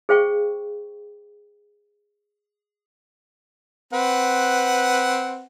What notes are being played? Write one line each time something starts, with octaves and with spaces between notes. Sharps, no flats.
G#4 C5 F5 G5 C#6
C4 B4 F#5